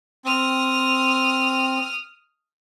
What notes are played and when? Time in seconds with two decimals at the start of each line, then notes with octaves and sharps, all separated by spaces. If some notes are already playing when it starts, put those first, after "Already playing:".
0.25 C4 D#6 F6